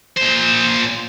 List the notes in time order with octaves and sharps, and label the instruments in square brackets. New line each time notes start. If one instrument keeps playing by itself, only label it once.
[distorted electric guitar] A#2 C5